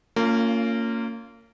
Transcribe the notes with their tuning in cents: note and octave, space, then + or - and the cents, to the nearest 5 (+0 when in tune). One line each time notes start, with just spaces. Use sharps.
A#3 -30 C#4 +15 F4 +0